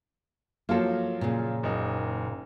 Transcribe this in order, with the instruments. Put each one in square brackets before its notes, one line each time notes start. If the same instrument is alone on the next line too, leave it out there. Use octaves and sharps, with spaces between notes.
[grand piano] F3 F#3 F4 [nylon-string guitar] A#3 A4
[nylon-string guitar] A#2 C#3
[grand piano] F#1 D#4